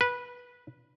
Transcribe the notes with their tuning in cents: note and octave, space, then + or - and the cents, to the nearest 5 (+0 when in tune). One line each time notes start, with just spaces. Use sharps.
B4 -15